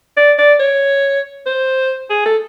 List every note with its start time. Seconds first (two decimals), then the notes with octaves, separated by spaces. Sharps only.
0.17 D5
0.39 D5
0.60 C#5
1.46 C5
2.10 G#4
2.26 A4